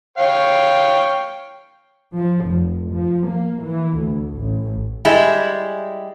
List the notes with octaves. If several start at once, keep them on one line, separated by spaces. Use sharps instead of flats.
C#5 F5 G5
F3
F1
F3
A#3
E3
D2
A1
G3 G#3 E4